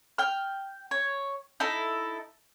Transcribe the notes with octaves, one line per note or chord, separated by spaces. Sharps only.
G5 F6
C#5
D#4 E4 A4